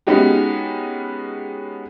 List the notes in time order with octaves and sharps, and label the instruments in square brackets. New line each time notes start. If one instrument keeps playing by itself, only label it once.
[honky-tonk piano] G#3 B3 C#4 D#4 F#4 G4